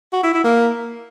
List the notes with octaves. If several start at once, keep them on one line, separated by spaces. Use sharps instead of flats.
F#4
E4
E4
A#3